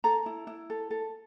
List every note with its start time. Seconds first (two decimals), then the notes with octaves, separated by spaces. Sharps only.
0.04 A4 A#5
0.26 E4
0.47 E4
0.70 A4
0.91 A4